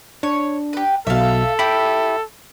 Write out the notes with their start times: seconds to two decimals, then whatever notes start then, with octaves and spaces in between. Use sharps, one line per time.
0.23 D4 C#5
0.73 G4 B4
1.07 B1 B2 A4 E5 F5
1.59 E4 G4 B5